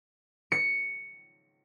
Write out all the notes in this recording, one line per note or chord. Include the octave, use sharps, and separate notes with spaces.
C#7